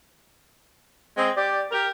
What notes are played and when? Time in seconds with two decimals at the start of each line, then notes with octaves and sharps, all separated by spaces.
1.16 G#3 C4
1.35 G4 D5
1.71 G4 A#4